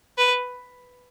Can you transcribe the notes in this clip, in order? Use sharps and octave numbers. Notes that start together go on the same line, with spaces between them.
B4